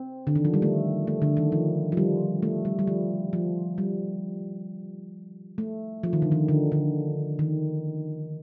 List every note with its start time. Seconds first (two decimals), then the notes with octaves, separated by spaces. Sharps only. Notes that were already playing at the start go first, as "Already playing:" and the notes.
Already playing: C4
0.27 D3
0.36 D#3
0.45 F3
0.54 G3
0.62 A3
1.07 A3
1.22 D3
1.37 D#3
1.52 F3
1.92 F3
1.97 G3
2.43 A3
2.65 G3
2.79 G3
2.87 F3
3.33 F3
3.78 G3
5.58 A3
6.03 F3
6.13 D#3
6.22 D3
6.32 D#3
6.48 D3
6.72 D3
7.39 D#3